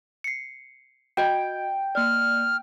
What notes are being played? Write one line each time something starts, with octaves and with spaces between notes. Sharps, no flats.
C7 C#7
F#4 D#5 G5
A#3 D5 F6